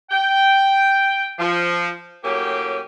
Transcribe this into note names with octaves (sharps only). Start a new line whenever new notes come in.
G5
F3
A2 F#3 A#3 C#4 G4